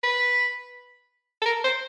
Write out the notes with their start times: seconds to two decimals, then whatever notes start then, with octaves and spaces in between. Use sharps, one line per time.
0.04 B4
1.42 A4
1.46 A#4
1.64 C5